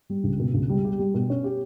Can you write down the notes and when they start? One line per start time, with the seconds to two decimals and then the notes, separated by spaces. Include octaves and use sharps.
0.10 G3
0.24 C#2
0.39 B2
0.54 C#2
0.69 G3
0.85 G4
0.99 G3
1.14 B2
1.30 C#4
1.44 G4